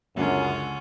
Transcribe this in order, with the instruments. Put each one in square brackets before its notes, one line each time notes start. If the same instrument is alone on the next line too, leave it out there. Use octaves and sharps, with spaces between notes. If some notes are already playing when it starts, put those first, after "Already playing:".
[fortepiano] C#2 D3 G#3 [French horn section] F#2 [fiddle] C#4 F4